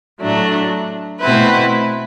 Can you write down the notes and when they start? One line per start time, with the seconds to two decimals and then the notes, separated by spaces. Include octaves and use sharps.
0.20 A2 F#3 A3 D4
1.20 B2 A3 C4 E4 B4